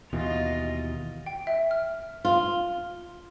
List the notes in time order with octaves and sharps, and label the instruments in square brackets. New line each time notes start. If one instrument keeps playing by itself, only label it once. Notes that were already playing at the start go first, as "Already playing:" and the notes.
[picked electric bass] D#2 B2 E3 [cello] F4 D#5
[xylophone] G5
E5
F6
[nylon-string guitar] F4